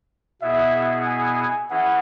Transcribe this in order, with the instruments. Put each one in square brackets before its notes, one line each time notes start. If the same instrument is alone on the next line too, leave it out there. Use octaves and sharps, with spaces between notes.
[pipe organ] B2 B3 E4 G#4 [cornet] E5
[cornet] G#5
[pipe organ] E3 C#4 E4 G#4 [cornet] F#5